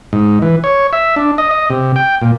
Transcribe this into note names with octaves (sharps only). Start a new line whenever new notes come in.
G#2
E3
C#5
E5
D4
D#5
D#5
C3
G5
A#2